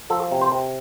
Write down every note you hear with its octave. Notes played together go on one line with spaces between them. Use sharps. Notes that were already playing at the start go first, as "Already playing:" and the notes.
F3 A4
C3
C5
C3